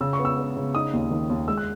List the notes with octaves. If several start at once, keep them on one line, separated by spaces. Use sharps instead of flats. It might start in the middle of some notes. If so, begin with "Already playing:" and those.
C#3 E6
C#6
B3
E6
B3
C#3
D#4 D#6
D#2
D#3
D#2
G#3 E6
F#6